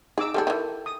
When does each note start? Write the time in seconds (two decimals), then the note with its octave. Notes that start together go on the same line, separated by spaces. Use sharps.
0.18 D#4 G#4 D6 E6
0.34 G3 F4 G#4 A4 G5
0.47 D#3 E3
0.86 D#6